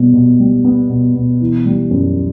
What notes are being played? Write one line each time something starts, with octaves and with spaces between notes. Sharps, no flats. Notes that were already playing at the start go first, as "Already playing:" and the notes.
Already playing: B2 G3 B3
B2
G3
B3
B2
B2
E3
G3
F#2